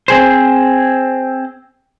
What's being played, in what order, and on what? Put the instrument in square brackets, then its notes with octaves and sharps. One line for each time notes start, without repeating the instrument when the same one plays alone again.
[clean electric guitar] C4 G#4 C5